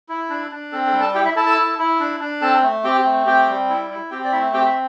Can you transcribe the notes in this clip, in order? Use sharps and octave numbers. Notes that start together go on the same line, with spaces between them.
E4
D4
D4
C4 A4
A4
G3
A4 A5
E4 G4 G5
E4 E5
E4 A4 A5
A4 A5
E4
E4
D4
D4
C4 A4 A5
A3
C4 G4 G5
A3
C4 G4 G5
G3
E4
E4
C4 G4 G5
D5
A3 E4 E5
C4 G4 G5
E5